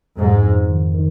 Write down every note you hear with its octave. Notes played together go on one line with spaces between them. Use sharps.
F2 G#2
F2
D#3
D#3